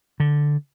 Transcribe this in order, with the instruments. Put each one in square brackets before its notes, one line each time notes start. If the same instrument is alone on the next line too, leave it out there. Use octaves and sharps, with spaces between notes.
[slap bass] D3